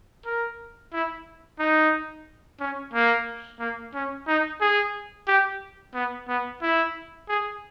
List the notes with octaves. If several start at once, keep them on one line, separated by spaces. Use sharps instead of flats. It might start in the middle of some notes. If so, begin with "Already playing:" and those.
A#4
E4
D#4
C#4
A#3
A#3
C#4
D#4
G#4
G4
B3
B3
E4
G#4